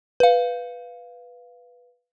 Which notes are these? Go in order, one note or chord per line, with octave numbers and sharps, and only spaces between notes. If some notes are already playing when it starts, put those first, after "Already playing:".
B4 F5